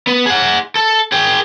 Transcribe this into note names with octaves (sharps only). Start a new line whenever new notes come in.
B3
G#4 F#5
A4
G#4 G5